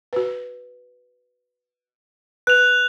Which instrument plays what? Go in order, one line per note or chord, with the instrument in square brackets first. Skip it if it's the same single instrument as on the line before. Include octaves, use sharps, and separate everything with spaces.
[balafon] F#4 B4
[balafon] B4 [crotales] F#6 F7